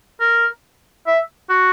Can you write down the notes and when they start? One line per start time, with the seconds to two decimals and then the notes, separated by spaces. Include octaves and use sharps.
0.20 A#4
1.06 E5
1.49 F#4